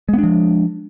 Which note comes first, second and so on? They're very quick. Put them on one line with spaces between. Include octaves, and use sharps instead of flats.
G#3 B3 D4 F3